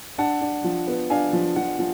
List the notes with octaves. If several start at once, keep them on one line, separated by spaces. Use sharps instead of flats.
D4 F#5 A5
D4
F3
B3
D4 F5 G#5
F3
F3 F#5
F3